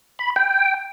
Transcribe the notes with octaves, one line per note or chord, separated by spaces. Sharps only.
B5
G5